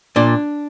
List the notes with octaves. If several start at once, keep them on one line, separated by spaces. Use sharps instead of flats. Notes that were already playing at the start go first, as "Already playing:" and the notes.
A#2 D4